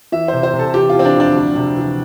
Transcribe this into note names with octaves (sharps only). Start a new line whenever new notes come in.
E3 E5
C3 C5
C5
C3
A4
E3 G4
F4
E3 C4
D4
F2 D4
D2
C3
E3